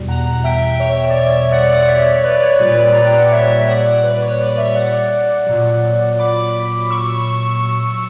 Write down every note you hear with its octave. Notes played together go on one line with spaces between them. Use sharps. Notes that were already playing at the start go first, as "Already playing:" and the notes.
Already playing: E2 B2 G3
F#5 A#5
F#5 A#5
E5 G5
C#5 E5
D5
C#5 E5
D5 F#5
C#5 E5
C#5
B4 D5
C#5
A#2 G3 B4 D5
A#5
G5
F#5
C#5 E5
D5 F#5
B4 D5
C#5
B4 D5
C#5 E5
D5 F#5
A#2 F#3
B5 D6
C#6 E6